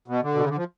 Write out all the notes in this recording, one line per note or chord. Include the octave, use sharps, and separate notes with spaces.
B2
D3
B2
C#3
D3
F3